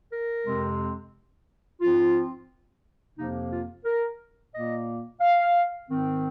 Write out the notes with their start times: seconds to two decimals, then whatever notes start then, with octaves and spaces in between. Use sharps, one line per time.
0.12 A#4
0.46 F2 C3 G#3 C4
1.81 G#2 F3 C4 F4
3.18 F2 C3 F3 A#3 D#4
3.51 F4
3.85 A#4
4.53 A#2 A#3 D#5
5.21 F5
5.89 G#2 D#3 C4